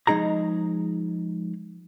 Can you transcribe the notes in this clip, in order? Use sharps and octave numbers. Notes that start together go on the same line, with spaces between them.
F3 G#3 D#4 G#4 A#5